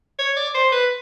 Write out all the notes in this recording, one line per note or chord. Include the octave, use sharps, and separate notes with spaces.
C#5
D5
C5
B4